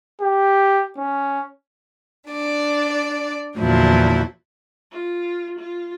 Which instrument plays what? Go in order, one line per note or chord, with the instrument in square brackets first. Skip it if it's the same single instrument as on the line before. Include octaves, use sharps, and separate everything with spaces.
[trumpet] G4
C#4
[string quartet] D4 D5
E2 A#2 D3 F3 F#3 E4
[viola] F4
F4